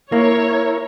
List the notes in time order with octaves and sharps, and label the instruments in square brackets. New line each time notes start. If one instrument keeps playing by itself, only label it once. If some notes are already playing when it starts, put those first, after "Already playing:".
[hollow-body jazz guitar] A#3 [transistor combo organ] E4 A#4 [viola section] C#5